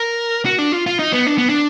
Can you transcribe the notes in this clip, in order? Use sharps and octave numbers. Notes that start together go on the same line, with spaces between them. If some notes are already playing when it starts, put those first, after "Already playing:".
Already playing: A#4
F#4
D4
F4
F4
D#4
B3
D4
B3
D4